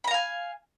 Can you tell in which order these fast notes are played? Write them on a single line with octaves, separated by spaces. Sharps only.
B5 A#5 F5 G#5